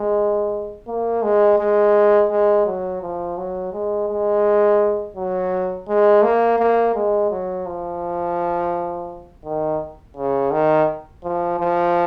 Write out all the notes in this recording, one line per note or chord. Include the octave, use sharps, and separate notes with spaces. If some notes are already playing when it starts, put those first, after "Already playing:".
Already playing: G#3
A#3
G#3
G#3
G#3
F#3
F3
F#3
G#3
G#3
F#3
G#3
A#3
A#3
G#3
F#3
F3
D#3
C#3
D#3
F3
F3